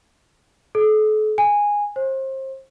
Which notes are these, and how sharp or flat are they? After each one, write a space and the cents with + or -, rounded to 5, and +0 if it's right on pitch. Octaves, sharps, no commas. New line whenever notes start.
A4 -40
G#5 -10
C5 +30